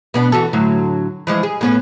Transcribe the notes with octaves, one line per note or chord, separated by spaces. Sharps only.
B2 B3 D4
E3 F#4 A4
A2 D3 F#3
E3 F3 G#3
G#4
A2 B3 C#4